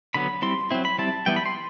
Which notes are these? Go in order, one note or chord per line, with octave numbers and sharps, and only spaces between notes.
D3 F#3 B3 B5
G3 C4 E4 C6
F#3 C4 E4
B5
G3 C4 E4 A5
E3 G3 B3 E4 G5
B5
C6